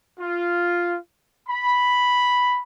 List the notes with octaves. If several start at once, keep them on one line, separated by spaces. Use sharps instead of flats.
F4
B5